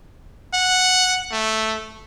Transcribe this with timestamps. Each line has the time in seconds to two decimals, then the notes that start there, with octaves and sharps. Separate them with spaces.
0.53 F#5
1.31 A3